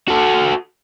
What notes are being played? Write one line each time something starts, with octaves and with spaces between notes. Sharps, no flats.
F#4 A4